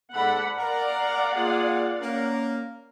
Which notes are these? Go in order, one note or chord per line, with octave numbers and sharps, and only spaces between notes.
G#2 A4 D5 F#5 B5
A#4 D5 F5 F#5
A#3 F4 G#4
A#3 C#4 A#4